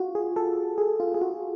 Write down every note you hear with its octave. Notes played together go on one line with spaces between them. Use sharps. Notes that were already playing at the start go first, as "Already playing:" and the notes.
Already playing: F4 F#4
G#4
A4
G#4
F4
G#4
F#4